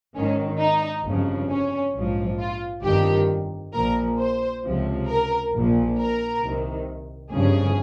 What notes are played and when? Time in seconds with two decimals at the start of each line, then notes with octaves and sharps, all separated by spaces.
0.14 G#1 G#2 D#3 C#4
0.59 D#4
1.04 G1 F2 C#3 F3
1.49 C#4
1.94 A#1 G#2 F3
2.39 F4
2.84 G1 F2 D#3 G4
3.73 A#1 A#2 F3 A#4
4.19 C5
4.64 C#2 C3 F3
5.08 A#4
5.53 A#1 A#2 F3
5.98 A#4
6.42 C2 C3 D#3
7.32 G1 F2 C#3 G#4